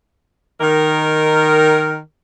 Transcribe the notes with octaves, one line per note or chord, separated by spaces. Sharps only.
D#3 A#4